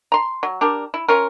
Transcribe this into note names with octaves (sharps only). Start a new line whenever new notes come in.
A#5 C6
F#3
D4 G4 A#4
E4
C#4 F4 A#4